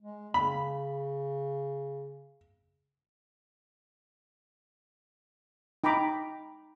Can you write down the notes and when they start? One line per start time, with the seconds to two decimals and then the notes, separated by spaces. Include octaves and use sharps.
0.01 G#3
0.34 C#3 B5
5.84 D#4 G5 A#5 B5 D6